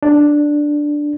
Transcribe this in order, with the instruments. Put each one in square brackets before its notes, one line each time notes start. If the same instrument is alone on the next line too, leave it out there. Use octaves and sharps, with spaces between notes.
[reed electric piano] D4